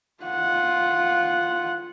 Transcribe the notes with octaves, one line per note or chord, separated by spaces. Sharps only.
F4 F#5